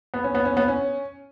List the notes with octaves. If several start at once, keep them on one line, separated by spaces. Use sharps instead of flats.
B3
C#4
B3
C#4
B3
C#4